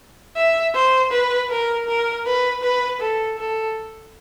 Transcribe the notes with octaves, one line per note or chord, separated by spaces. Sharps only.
E5
C5
B4
A#4
A#4
B4
B4
A4
A4